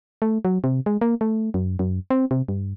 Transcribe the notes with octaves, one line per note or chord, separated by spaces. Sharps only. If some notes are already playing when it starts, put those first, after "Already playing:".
A3
F#3
C3
G#3
A#3
A3
F#2
F#2
C4
C3
G2